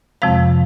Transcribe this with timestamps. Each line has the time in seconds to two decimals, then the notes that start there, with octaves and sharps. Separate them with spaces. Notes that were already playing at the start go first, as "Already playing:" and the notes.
0.22 F2 C3 F3 G#3 C4 F5